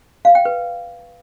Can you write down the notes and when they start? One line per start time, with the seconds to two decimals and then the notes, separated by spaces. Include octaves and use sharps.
0.25 F5
0.35 G5
0.45 B4